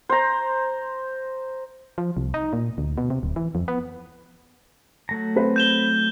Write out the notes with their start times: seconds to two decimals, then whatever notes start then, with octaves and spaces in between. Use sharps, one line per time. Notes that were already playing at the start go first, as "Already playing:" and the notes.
0.09 C5 A#5
1.98 F3
2.17 C2
2.34 D#4
2.53 A#2
2.78 D2
2.98 B2
3.10 C3
3.23 D1
3.36 E3
3.55 F2
3.68 B3
5.09 F#3 A3 A#5
5.36 C4 B4 C5
5.56 G6 E7 G7